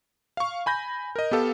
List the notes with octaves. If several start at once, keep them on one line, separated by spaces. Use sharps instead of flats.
F5 C#6
G#5 B5 G6 A#6
A#4 D#5
B3 G4 A4 F5